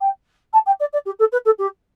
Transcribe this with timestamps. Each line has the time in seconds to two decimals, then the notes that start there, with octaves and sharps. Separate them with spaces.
0.01 G5
0.53 A5
0.66 G5
0.80 D5
0.93 D5
1.05 G4
1.19 A4
1.32 B4
1.45 A4
1.58 G4